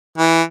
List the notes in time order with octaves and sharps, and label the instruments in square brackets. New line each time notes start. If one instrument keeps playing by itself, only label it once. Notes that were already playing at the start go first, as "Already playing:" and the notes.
[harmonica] E3